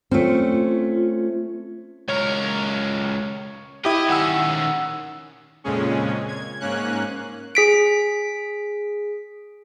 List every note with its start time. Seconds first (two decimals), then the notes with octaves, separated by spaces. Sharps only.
0.11 A3 C4 C#4 F4
2.08 C#2 A#4 C#5
3.85 E4 G4 D#5
4.10 D#3 C#4 F#5 E6
5.64 F2 A#2 C#3 G#3 C#4
6.28 G#6
6.60 G#2 A#3 C#4 F#6
7.55 G#4 B6 D7